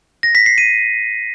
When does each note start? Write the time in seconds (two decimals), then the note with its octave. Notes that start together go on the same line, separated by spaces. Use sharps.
0.23 A#6
0.35 B6
0.46 C7
0.58 D#7